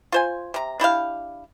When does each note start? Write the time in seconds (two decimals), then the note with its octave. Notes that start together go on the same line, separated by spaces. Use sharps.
0.12 F4 C5 G#5
0.54 C3 A#5
0.80 D4 E4 G4 F5